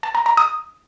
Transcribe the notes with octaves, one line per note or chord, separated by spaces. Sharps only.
A5
A#5
A#5
D#6